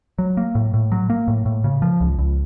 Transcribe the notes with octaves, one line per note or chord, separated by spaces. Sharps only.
F#3
A#3
A2
A2
F#3
A#3
A2
A2
C#3
F3
C#2
C#2